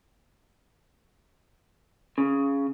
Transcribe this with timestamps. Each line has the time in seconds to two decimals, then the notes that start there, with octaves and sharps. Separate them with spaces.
2.18 C#3